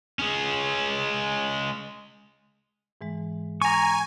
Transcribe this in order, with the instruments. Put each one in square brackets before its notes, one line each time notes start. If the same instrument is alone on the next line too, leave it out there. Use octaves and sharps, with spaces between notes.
[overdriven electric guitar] G#3 C#4
[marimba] G#2 E3 G#3
[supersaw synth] G#5 [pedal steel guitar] A#5 C#6